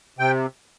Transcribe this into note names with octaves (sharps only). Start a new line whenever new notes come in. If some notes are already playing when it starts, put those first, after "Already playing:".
C3 G5